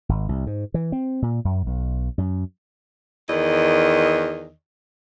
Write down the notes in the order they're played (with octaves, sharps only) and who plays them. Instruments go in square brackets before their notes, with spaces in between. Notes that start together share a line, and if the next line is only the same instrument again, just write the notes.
[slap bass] G#1
C2
G#2
E3
C4
A#2
F#2
B1
F#2
[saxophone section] E2 D#3 D#5